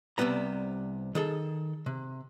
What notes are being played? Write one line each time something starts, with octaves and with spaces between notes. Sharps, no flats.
C2 C3 G3 B3 A#5
D#3 G#4 A4
C3